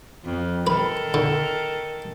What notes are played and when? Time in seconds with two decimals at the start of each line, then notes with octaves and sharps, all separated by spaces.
0.25 F2
0.67 D#3 A4 B4
1.14 D3